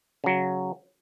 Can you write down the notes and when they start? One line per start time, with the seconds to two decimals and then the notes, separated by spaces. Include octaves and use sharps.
0.24 C#3 F#3